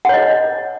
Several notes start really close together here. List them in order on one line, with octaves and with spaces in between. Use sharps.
F#5 C#5 D#5